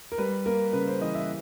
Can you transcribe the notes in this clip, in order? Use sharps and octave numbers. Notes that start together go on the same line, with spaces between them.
A#4
G3 B4
A#3 A#4
C#3 B4
C5
E3 D#5
E5